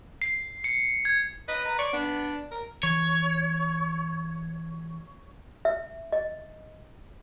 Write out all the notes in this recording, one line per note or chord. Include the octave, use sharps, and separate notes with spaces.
C7
C#7
G#6
B4 D#5
A#5
D5 C#6
B3 D4
A#4
E3 C#5
E5
D#5